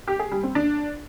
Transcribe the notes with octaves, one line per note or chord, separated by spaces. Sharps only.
G4
G#4
G3
C4
D4